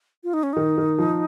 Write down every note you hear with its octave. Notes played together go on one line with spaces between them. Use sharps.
F4
D#4
C#4
D#3 D#4
D#3
F3